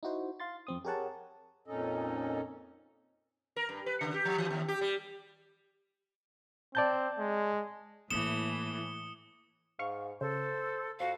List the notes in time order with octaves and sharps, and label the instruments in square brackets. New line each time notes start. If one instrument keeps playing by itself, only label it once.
[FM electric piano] D#4 E4 F#4 C5
F5 C6 A6
F2 C4 D#6
G4 G#4 A#4 C#5 F#5 A5
[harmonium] F2 A#2 C#4 D#4 A4 D#5
[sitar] A#4
G2
B4
C#3
G4
F3
E3
D#2
G4
G3
[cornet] C4 [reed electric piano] D5 A5 G6
[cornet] G#3
[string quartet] A2 E3 [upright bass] A#3 E4 [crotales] D#6 C#7 G7 [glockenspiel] E7
[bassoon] G#2 [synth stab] F5 C#6
[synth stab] C#3 [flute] A4 [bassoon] C5
[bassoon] F2 [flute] F#4 [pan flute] F5